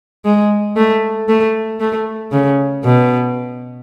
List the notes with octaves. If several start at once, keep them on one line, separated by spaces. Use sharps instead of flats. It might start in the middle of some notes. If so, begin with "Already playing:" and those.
G#3
A3
A3
A3
C#3
B2